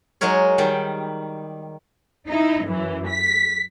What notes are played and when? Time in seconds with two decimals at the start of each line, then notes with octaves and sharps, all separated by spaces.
0.21 F#3 G#3 D#4 A#4 C#5
0.58 D#3 G3 G5
2.28 D#4 E4
2.65 F#2 E3
3.08 B6